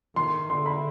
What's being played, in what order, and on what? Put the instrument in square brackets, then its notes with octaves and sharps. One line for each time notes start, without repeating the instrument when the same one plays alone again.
[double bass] D#3 [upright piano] C6
[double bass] D3 [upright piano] C6
[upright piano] B5